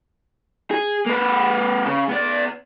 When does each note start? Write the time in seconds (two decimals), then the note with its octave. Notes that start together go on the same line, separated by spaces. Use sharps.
0.71 G#4
1.07 A#3 B4
1.86 C#3
2.09 B3 D5